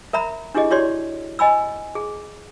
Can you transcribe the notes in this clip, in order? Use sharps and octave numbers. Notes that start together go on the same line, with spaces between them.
A#4 E5 A#5 B5
D4 E4 G4 G#4 D#5
E4 F#4 G4 C#5 D5 C6
D#5 G#5 B5 E6
G#4